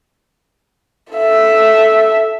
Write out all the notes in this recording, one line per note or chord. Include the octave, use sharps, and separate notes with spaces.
A4 E5